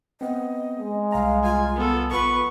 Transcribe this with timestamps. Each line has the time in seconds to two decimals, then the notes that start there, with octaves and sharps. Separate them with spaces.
0.21 B3 C4 D#5
0.79 G#3
1.12 C2 F5 A#5
1.43 F4 G#5
1.76 B3 A4
2.12 A#1 B3 F4 B4 B5 C#6